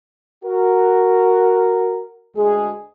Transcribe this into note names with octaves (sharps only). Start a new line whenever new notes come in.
F#4 A#4
D2 G#3 G#4